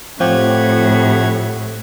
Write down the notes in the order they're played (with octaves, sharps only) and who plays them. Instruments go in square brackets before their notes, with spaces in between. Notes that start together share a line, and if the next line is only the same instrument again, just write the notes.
[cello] A2 [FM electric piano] F3 G4 [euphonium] C4 [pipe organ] C#5 F#5 G#6